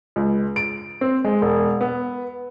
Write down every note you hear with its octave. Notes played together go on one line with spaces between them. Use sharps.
C#2
D7
C4
G#3
E1
B3